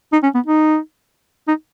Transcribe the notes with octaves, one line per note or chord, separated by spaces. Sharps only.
D#4
C#4
B3
D#4
D#4